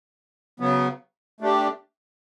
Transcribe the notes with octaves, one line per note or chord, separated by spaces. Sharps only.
C#3 F#3 B3
A3 D4 G4